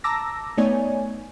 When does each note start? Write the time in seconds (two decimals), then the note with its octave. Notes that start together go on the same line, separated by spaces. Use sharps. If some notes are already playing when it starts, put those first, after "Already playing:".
0.04 A5 A#5 D6 E6 A#6
0.58 A3 B3 D#4 C#5 D5 G#5